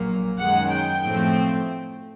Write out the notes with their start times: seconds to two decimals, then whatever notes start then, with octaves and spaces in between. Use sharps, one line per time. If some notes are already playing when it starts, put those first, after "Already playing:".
Already playing: A#1 A#2 F#3 A#3
0.39 F#2 D#3 G#3 F#5
0.72 G5
1.03 A2 F3 A3 C4